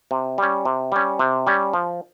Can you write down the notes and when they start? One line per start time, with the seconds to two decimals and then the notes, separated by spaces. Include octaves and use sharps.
0.11 C3
0.38 G3 C#4
0.65 C3
0.92 G3 C#4
1.19 C3
1.47 G3 C#4
1.73 F3